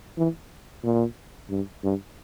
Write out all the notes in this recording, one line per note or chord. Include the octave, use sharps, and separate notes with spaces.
E3
A#2
G2
G2